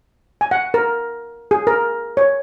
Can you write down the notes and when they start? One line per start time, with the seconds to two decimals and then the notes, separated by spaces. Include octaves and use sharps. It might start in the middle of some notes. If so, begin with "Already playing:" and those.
0.41 G#5
0.51 F#5
0.74 A#4
1.51 G#4
1.67 A#4
2.17 C#5